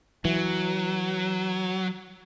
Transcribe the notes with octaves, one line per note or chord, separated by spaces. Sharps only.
E3 F#3